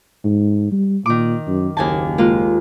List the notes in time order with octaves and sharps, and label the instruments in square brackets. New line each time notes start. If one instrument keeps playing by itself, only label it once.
[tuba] G#2
G3
[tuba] A#2 [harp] D#3 D6
[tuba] F#2
[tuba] F#1 [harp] D#2 G#5 A5
[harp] G#3 A#3 F4